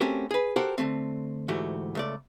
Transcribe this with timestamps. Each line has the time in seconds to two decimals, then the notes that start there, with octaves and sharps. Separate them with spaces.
0.01 A3 C4 C#4 F#4 G4 A#4
0.31 G#4 B4
0.56 F#4 G4 A4 A#4 C5 F#5
0.78 D3 D#3 A3 C4
1.48 D2 G#2 E3 A3 F#4 G4
1.95 C#2 A3 D5